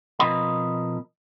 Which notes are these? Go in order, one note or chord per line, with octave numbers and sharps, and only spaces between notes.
B2 F3 C4 A#4 D#5 B5